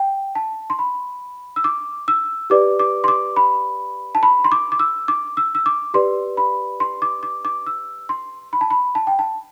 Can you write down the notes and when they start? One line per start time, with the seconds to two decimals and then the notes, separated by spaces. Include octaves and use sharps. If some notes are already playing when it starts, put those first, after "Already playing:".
Already playing: G5
0.35 A5
0.70 C6
0.79 B5
1.56 E6
1.64 D6
2.08 E6
2.50 G4 B4 D5 D6
2.79 D6
3.04 C6
3.08 D6
3.36 B5
4.15 A5
4.23 B5
4.44 C6
4.52 D6
4.72 D6
4.80 E6
5.08 D6
5.37 E6
5.55 E6
5.66 D6
5.94 G4 B4 D5 C6
6.37 B5
6.80 C6
7.02 D6
7.23 D6
7.45 D6
7.67 E6
8.09 C6
8.53 B5
8.61 A5
8.71 B5
8.95 A5
9.07 G5
9.19 A5